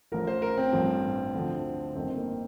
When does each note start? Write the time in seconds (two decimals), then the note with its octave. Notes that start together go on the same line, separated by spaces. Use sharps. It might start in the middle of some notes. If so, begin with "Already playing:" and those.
0.12 A1 A2 F3 A#4
0.27 C5
0.42 A#4
0.57 C4
0.73 A1 G2 F3
1.34 D2 D3 F3
1.95 G1 F2 D#3 C4
2.17 A#3